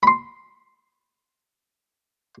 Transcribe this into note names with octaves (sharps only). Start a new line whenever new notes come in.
B5 C6